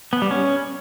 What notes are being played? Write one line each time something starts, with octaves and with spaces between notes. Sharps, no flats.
B3
G3
C#4